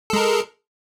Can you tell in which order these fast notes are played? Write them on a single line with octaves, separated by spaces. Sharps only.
A4 G#3 A#4